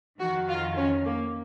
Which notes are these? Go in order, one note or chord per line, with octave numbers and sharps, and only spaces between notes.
F2 D#3 F#4
F4
C#4
A#3